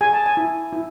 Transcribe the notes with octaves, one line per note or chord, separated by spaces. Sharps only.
G#4 G#5
A5
G#5
E4
E4